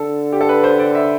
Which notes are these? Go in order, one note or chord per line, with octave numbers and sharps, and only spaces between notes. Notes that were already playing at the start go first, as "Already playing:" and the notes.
Already playing: D3 A4
G4
A4
B4
C5
D5
E5